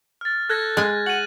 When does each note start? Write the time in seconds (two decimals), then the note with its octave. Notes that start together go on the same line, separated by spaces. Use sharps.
0.21 F6 A6
0.50 A4 F#6 G#6 A#6
0.77 G#3 G#5
1.06 F#5 D#7 F#7